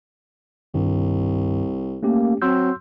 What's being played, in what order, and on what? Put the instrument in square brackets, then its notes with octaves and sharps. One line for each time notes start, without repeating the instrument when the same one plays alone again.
[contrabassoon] C2 [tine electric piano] G2 D#3
[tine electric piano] A3 C#4 G4 [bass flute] A#3
[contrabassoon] F#3 [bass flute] C4 [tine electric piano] C6 E6 G6